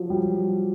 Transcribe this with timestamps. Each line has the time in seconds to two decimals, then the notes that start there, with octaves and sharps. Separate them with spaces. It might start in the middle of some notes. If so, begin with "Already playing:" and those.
Already playing: F3 F#3
0.10 G3